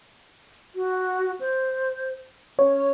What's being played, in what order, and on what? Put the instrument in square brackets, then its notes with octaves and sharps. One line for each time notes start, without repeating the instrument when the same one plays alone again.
[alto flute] F#4
C5
[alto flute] C#4 [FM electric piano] C#5